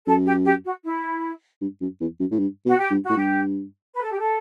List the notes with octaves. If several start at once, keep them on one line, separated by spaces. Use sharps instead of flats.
F#2 A4
G4
G4
F#4
E4
G2
F#2
E2
F#2
A2
G2
B2 F#4
G4
G2
A2 F#4
G2 G4
B4
A4
G4
A4